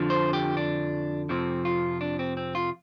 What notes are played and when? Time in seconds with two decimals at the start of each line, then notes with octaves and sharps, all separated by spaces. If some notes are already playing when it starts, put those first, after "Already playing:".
Already playing: F2 D3 F3
0.10 C5
0.33 G4
0.57 D4
1.29 F2 C3 F3 C4
1.65 F4
2.01 D4
2.19 C4
2.37 C4
2.55 F4